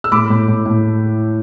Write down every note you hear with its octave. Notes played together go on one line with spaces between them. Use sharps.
E6
A2 B5 D6
A2
A2
A2